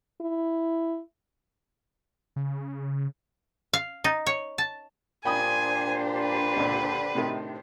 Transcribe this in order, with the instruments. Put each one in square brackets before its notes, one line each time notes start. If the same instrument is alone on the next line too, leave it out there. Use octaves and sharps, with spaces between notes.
[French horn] E4
[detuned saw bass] C#3
[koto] F5
D#4
C#5
A5
[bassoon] A#2 [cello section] D4 G4 C5 [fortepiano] G5 B5 D#6 [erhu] G#5
[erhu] B4
[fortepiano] C#2 A#2 [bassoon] D3
[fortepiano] A2 C3 D#3